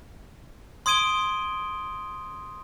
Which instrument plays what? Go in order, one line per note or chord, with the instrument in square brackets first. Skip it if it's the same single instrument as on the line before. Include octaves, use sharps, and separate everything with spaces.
[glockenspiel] C6 D#6 G#6 D7 D#7 G7